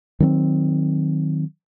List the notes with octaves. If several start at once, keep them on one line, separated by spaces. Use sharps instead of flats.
D#3 F#3 B3 C4